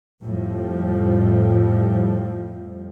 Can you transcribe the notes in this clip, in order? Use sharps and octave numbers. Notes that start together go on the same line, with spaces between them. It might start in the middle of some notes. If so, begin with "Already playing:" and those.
F2 A2 F3 G3